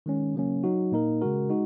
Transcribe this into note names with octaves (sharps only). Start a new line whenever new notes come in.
D#3 G#3 C#4
C#3 F#3 A#3 C#4
F#3 D#4 F#4
A#2 A#3 D#4 A#4
C#3 G#3 F#4 A#4
G#3 D#4 F#4